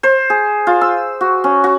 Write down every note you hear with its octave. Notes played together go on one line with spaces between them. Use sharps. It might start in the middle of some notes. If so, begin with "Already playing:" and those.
C5
G#4
F4
E6
F#4
C#4
F#4